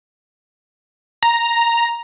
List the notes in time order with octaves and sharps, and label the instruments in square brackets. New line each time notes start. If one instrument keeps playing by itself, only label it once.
[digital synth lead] A#5